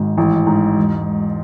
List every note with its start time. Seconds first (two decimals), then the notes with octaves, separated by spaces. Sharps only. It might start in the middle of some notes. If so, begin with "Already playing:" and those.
Already playing: G#1 G#2
0.17 A1
0.47 G#2
0.77 E1